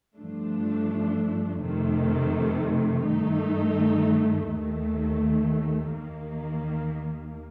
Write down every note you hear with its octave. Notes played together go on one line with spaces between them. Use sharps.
G2 F3 A3 D4
F2 C3 D#3 A3
G2 D#3 A3 D#4
D#2 D#3 A3
D#2 D#3 A#3